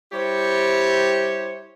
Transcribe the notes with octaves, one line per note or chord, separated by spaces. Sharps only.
G3 E4 G4 C5 C#5